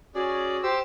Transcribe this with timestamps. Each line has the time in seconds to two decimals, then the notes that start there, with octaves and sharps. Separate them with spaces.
0.15 C#4 F#4 G#4 D5
0.63 G4 C5 E6